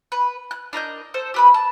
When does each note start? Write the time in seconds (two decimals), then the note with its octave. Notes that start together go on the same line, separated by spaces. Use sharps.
0.12 B4
0.51 F#6
0.73 D4 A#4 D#5 G6
1.14 A4 C5
1.34 G4 B4 B5
1.54 A5